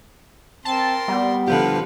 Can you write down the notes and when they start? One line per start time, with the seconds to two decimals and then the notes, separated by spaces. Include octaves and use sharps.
0.65 C4 A#4 A5 C6
1.08 G3 B3
1.47 D3 F3 G4 B4 F5